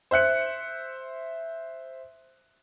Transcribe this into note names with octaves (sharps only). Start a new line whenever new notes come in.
C5 E5 F#6 C#7